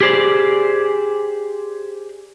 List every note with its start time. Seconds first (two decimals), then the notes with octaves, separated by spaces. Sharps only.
0.01 G4 G#4 C5 D5